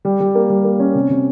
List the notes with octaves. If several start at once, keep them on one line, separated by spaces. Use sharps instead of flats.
G3
G3
A#3
G3
A#3
C#4
C3
C3